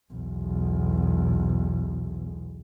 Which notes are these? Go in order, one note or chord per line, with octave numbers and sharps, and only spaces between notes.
B1 E2